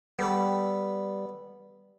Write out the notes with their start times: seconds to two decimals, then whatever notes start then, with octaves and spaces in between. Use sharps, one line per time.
0.19 G3 B3 A4 B4